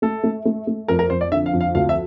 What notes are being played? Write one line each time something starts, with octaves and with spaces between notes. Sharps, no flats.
A3 A4
A3
A3
A3
F2 A#4
A#4
F2 C5
D5
D3 E5
F5
F2
F5
D2 F5
E5